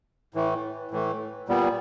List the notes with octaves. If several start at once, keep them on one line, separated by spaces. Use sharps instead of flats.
A2 E3 A3
A2 E3 A3
A#2 G3 B3